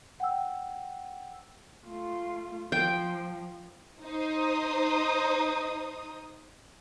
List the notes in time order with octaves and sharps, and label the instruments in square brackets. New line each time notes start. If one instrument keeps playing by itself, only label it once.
[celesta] F#5 G5 E6
[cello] A3 F4
[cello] F3 [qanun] G5
[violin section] D#4 C5 D#6